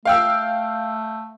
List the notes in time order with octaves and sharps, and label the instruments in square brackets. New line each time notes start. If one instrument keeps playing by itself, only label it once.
[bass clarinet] A3 [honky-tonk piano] F5 G5 E6